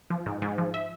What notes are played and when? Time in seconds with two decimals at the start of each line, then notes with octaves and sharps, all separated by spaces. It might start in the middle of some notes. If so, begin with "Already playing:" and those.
0.10 F3
0.26 G#2
0.42 G#2
0.58 F3
0.74 E5